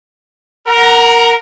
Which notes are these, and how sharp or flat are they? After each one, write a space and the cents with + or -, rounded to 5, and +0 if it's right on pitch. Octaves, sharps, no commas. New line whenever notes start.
A#4 -5 F#5 +0 A#5 +25